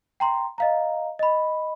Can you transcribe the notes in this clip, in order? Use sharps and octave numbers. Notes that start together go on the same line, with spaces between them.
G5 A#5 C6
D#5 F5 A#5
D#5 B5